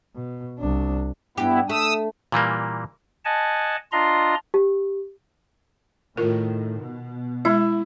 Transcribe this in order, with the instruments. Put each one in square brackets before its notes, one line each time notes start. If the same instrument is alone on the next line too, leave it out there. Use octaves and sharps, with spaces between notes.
[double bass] B2
C2 D4
[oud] G2 G4 [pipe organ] B3 E4
[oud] A3 [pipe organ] D#6 E6
[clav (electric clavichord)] A#2 E3 G3 A#3
[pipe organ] D#5 F#5 G#5 A5
D4 F4 D#5 A#5 C6
[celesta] G4
[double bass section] A2 D#3 [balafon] F4 A#4
[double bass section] B2
[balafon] G#3 E5 [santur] E4